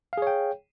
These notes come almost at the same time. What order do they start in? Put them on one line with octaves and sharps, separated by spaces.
F5 G#4 C#5 G5